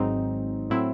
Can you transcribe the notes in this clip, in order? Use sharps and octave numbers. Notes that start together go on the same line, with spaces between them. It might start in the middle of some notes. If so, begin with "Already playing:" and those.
Already playing: G#1 G#2 F#3 C4 D#4
A2 F#3 C4 E4